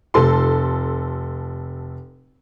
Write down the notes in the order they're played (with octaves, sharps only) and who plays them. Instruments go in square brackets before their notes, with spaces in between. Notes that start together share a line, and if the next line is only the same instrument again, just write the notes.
[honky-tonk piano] F1 A4 C6